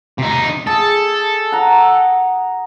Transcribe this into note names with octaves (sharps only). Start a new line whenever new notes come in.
C3 D#4
G#4 A4
F#5 A#5